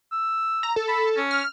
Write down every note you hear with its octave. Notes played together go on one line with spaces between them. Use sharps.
E6
A#5
A4
B5
C#4
F6